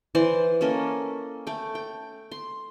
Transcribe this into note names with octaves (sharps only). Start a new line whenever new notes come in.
E3 C5 D5 C6
A#3 C#4 A4 D#5
A3 G5
G5
C6